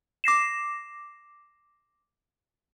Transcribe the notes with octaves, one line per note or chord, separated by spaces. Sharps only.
D6 A#6 C7 E7